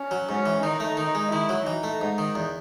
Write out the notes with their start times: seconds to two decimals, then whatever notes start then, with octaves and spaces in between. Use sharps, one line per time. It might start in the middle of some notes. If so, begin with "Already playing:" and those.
Already playing: C#4
0.11 F#3
0.29 G#2 C#4
0.46 E3
0.63 D#3 D#4
0.80 A3
0.97 D#3
1.15 G#3
1.32 D#3 E4
1.49 F#3
1.66 E3 D#4
1.83 A3
2.01 G#2
2.18 D#3
2.35 E2